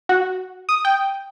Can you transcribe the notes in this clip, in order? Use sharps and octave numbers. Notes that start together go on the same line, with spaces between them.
F#4
D#6
G5